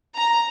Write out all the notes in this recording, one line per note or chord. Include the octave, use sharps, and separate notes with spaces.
A#5